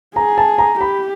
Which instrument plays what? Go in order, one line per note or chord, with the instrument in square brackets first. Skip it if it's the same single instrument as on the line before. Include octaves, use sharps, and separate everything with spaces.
[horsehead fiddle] G#4 [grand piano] A#5
[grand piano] A5
A#5
[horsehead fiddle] G4 [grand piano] B5